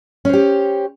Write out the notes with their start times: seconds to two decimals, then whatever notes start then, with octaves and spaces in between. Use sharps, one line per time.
0.25 C#4
0.29 C5
0.33 G4